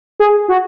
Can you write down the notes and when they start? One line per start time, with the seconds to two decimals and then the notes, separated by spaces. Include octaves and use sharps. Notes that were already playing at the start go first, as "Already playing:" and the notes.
0.20 G#4
0.48 F#4